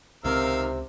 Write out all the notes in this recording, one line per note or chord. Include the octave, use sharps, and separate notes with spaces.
C#2 C3 D#3 C4 A#4 F5 E6